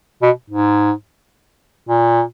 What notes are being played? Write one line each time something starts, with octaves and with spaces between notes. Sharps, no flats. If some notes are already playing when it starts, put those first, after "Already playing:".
B2
G#2
A#2